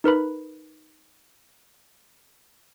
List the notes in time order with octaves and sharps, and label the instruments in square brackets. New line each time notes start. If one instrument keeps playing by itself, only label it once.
[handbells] D#4 A#4 B4 B5